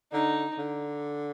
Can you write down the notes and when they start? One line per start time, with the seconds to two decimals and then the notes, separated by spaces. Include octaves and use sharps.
0.12 D3 D#4
0.58 D3